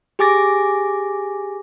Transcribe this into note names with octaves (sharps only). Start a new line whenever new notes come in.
G4 G#4 G#5 D6 A6 A#6